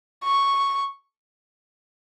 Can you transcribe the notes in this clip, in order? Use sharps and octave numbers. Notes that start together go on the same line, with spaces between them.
C#6